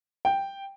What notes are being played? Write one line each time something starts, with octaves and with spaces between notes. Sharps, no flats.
G5